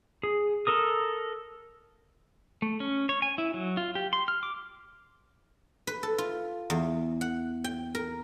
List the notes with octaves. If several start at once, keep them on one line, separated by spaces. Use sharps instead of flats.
G#4
A4 A#4 D#6
A3
C#4
C#5
G#5
E4
F#3
F4
G4
C6
F6
D6
B4
A4
F4
E2
F#5
G5
A#4